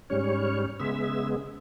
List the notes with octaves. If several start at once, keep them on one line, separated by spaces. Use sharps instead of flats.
G#2 G3 C#4 C#5
C#3 G#3 B3 E5